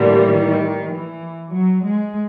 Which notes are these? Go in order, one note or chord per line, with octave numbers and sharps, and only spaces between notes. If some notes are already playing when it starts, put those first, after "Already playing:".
Already playing: A2 D3 E3 G3 A#3
D#3
E3
F#3
G#3